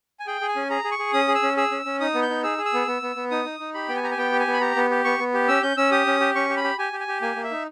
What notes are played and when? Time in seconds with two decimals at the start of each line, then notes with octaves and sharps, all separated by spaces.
0.20 G#5
0.27 G#4 G5
0.41 G#4
0.48 G#5
0.56 C#4
0.70 G#4 A#5
0.84 G#4
0.92 C#6
0.99 G#4
1.13 C#4 D#6
1.28 G#4
1.35 E6
1.43 C#4
1.57 G#4 E6
1.71 C#4
1.85 C#4
2.00 D#4 D#6
2.14 B3
2.22 G6
2.30 D#4
2.44 G#4 E6
2.58 G#4
2.65 E6
2.73 B3
2.87 B3
3.02 B3
3.16 B3
3.31 D#4 D#6
3.45 D#4
3.60 D#4
3.74 G4 B5
3.89 B3 G5
3.96 G#5
4.03 G4 A#5
4.11 G#5
4.17 B3 G5
4.32 G4
4.40 G#5
4.47 B3
4.53 B5
4.61 G4 A#5
4.76 B3
4.90 G4
5.04 B3 C#6
5.19 B3
5.34 G4
5.48 C#4 E6
5.63 C#4 G6
5.77 C#4 E6
5.91 G4 D#6
6.07 C#4
6.20 G4
6.35 C#4 C#6
6.49 G4
6.57 B5
6.64 G4
6.78 G4 G#5
6.93 G4
7.00 G#5
7.08 G4
7.22 A#3 G#5
7.36 A#3
7.44 E5
7.51 D#4